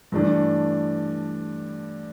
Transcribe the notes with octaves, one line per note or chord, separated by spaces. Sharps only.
G2 E3 A3 D4